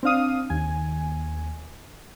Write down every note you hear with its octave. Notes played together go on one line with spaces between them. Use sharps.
C4 D4 F5 D#6
D#2 G#5